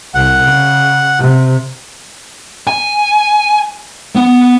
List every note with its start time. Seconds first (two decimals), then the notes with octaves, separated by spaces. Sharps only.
0.14 C2 F#5
0.43 C#3
1.19 C3
2.67 G#5
4.16 B3